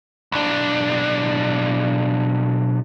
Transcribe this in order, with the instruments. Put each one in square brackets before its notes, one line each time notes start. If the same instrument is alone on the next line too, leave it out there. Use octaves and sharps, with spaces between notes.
[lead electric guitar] B1 D4